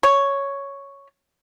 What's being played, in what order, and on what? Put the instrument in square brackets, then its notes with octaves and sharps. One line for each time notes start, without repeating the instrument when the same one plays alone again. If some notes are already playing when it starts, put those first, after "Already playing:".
[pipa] C#5